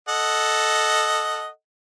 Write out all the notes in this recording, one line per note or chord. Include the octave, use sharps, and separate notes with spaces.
A4 D#5 F#5